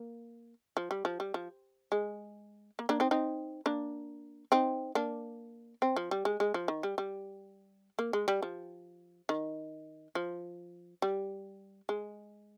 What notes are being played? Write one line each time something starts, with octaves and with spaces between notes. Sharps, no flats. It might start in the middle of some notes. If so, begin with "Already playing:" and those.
Already playing: A#3
F3
G3
F3
G3
F3
G#3
A#3
A#3 D4
C4 D#4
C4 D#4
A#3 D4
C4 D#4
A#3 D4
C4
F3
G3
G#3
G#3
F3
D#3
G3
G3
A#3
G#3
G3
F3
D#3
F3
G3
G#3